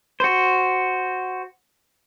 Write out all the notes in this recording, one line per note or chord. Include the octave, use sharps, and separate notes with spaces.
F#4 C5